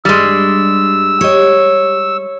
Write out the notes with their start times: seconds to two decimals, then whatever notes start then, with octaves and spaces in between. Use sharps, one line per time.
0.05 G2 G3 G#3 E6
1.21 G4 C#5 D#5